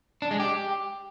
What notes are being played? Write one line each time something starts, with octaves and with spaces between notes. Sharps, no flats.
D4
G#3
G4